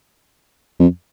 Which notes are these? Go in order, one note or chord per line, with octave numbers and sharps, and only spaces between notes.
F2